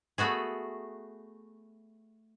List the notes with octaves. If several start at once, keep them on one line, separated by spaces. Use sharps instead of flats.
A3 B3 F#4 G#4